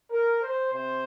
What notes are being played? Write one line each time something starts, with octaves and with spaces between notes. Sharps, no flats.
A#4
C5
C3 C5